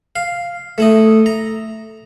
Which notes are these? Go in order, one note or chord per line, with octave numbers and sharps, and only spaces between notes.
F5
A3 E4 D#5
A#5